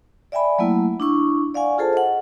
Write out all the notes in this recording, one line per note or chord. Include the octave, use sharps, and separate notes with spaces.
D5 E5 G5 G#5 B5
F#3 A3 A#3 E4
D4 E4 C#6
D5 F5 F#5 G#5 C#6
F4 G#4 A4 C5 A5
D#5 F#5